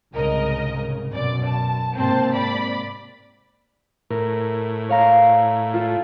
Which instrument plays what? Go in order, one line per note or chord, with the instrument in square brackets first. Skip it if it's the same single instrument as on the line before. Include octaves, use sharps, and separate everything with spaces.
[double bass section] C2 G#2 C#3 [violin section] A#4 D#5
[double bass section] F#2 B2 [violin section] D5
[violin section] A5
[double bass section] G#2 C3 A#3 [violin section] C4 C5 A5
[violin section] D5 B5
[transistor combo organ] A2 [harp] A#4
[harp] C#5 F5 A#5
F4 A4